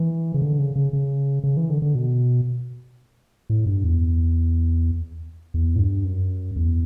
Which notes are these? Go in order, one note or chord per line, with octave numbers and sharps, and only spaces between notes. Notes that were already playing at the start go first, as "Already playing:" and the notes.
Already playing: E3
C#3
D3
C#3
C#3
C#3
C#3
E3
D3
D3
B2
A2
G2
E2
E2
A2
G2
F#2
E2